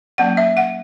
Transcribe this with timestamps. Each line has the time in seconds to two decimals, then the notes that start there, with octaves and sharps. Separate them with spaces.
0.18 F#3 A#3 C#4 F#5
0.37 E5
0.57 F#5